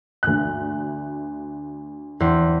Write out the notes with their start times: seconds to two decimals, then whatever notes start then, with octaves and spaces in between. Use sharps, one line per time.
0.23 D2 F#6
2.20 E2 C4 C6